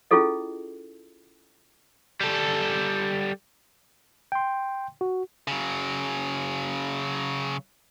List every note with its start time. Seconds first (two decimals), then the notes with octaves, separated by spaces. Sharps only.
0.11 C#4 E4 F4 G#4 A4 D#5
2.21 G3 A4
4.32 G5 C6
5.01 F#4
5.48 C#3 F#3